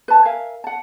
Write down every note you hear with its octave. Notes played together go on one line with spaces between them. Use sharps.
B4 A5
A#4 E5 F5 G#5
F#5 A5